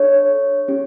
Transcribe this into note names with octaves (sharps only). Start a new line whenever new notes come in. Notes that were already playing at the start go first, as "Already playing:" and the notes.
Already playing: D4 A4 C#5
C#4 G4